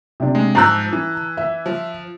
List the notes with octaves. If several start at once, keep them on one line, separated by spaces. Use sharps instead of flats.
C3 D4
G#3
G#2 F3 A5 A#5 E6 F#6
E3
E5
F3